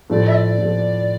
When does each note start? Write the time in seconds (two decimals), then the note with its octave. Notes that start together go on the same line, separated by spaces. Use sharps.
0.10 A2 F3 A3 D5
0.28 E5
0.34 D5
0.58 A2 F3 A3